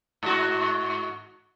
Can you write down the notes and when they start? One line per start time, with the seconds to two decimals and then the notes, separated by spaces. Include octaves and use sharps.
0.23 G#2 F#4